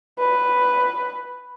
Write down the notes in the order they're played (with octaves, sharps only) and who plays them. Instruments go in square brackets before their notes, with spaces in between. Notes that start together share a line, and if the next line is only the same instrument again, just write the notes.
[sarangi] B4